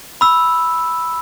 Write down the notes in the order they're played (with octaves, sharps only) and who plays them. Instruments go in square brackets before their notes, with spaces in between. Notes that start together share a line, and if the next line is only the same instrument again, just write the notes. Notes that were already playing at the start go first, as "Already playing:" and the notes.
[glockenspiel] B5 E6